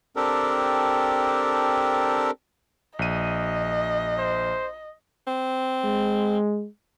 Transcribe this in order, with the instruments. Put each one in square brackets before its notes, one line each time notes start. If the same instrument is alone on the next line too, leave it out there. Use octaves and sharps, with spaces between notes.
[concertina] C4 D4 G4 A4 A#4
[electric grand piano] A#1 D#7 [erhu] D#5
[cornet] C5
[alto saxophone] C4
[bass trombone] G#3